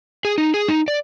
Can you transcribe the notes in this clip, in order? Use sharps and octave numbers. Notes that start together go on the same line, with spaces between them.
G#4
D#4
G#4
D#4
D5